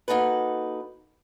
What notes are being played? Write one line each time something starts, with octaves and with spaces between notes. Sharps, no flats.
A#3 D#4 F#4 A4 B4